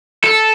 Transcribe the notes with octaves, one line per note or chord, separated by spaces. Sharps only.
A4